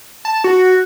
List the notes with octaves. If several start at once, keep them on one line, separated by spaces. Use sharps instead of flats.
A5
F#4